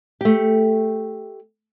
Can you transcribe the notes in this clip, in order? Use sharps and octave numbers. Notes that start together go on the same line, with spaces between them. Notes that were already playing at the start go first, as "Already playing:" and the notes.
A3 G4